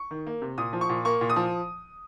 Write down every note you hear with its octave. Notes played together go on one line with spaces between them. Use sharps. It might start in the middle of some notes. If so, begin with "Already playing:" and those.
Already playing: C#6
D#3
A#3
C3
A#2 D#6
F3
C#6
A#2
A#3 C#6
A#2
D#6
F3